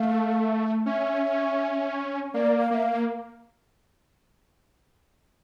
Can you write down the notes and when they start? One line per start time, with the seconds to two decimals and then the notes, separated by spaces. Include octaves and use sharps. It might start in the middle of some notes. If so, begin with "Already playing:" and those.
Already playing: A3 F5
0.86 C#4 E5
2.34 A#3 D5
2.58 F5
2.71 A#3 E5
2.83 F5